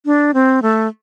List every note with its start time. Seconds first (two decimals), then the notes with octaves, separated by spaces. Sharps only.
0.05 D4
0.34 C4
0.62 A3